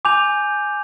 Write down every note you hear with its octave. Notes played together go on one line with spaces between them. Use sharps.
G#5 D6 G6 F7